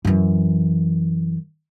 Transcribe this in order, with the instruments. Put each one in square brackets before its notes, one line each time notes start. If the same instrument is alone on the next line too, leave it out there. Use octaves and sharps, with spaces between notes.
[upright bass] F#2 E3